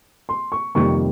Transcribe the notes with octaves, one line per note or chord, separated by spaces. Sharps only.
C6
C#6
F2 C3 D#3 G3 A#3 C#6